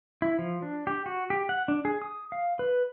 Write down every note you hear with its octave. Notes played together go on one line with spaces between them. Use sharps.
E4
F3
D4
G4
F#4
G4
F#5
D4
G#4
D#6
F5
B4